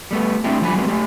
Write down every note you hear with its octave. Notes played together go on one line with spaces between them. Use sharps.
G3 A3 B3
A3 C4 D4 E4 G4
D3 F3 G3 G5 G#5 B5
F#3 G#3 A3 B3 C4 G4
A3 G4